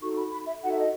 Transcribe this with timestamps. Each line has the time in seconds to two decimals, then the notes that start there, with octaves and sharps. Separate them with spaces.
0.01 D#4 F#4 A4 C#6
0.17 B5
0.32 B5
0.47 E5
0.63 D#4 F#4 A4 F#5
0.71 E5
0.79 D#5